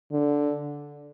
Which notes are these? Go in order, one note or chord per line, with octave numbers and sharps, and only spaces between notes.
D3